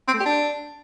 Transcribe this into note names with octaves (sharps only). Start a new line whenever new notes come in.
C4
A3
G4
D4